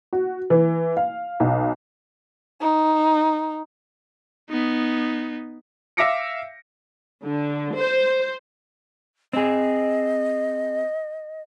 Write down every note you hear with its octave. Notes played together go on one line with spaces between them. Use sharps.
F#4
E3
F5
B1
D#4
B3 D#4
E5 F5 D6 A#6 C#7 D7
D3
C5
C4 G#4 D#5